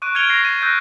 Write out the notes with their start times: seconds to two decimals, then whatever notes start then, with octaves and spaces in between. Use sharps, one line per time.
0.02 C#6 D6 F#6 D7 D#7
0.15 F6 G#6 C#7 D7 F7 G7
0.30 C#6 A#6 C7 F7
0.43 A6 D#7 G7
0.61 E6 F#6 G6 A#6 D#7